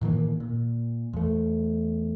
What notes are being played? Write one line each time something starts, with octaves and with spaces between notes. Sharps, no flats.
A2 D#3 E3 A#3
A#2
E2 A3